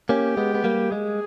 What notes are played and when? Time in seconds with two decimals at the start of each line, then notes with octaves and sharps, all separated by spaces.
0.09 A#3 C#4 G4
0.37 G#3 B3
0.55 B3
0.64 G3 A#3
0.92 G#3 G#4